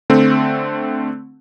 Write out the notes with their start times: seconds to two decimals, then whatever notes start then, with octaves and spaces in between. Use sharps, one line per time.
0.10 D3 A3 C4